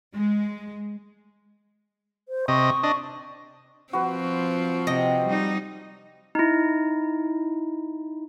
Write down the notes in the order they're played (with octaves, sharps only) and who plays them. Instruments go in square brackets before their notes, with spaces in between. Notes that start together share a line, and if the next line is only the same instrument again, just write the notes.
[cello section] G#3
[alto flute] C5
[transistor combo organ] C3 D#5 [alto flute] C#6
[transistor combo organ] D4 D#5
[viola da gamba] F3 C4 [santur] F#4 B4
[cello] C3 [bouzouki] D#5 G5
[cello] G3 D#4
[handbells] D#4 E4